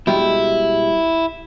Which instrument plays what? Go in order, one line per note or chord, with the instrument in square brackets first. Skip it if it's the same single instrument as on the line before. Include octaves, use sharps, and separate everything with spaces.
[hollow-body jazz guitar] B2 G3 G#3 [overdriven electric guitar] E4